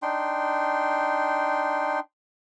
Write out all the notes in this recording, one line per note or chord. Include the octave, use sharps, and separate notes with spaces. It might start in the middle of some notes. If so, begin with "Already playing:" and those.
D4 D#4 G5 C6